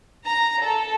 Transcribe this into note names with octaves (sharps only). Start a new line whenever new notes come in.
A#5
A4